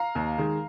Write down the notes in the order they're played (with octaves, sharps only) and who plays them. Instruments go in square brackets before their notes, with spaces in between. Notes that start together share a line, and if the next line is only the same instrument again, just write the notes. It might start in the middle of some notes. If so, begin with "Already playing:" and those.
Already playing: [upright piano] F5 A#5
D#2
D#3 G#3